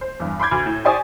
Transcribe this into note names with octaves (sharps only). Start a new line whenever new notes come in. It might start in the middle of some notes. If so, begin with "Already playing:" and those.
C5
E2 G2
B5 C6 D6 G6 G#6
D2
A2
G4 C5 D5 G#5 C#6 D#6